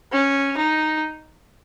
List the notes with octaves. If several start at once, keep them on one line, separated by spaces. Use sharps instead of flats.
C#4
D#4